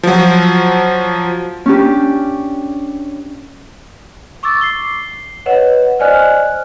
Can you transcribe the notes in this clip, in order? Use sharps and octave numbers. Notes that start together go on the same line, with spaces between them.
F3 F#3
C#4 D4 G4
C#6 D6 E6 A6
C7 G7
B4 C#5 D#5 F#5
C5 D5 D#5 G#5 F6 F#6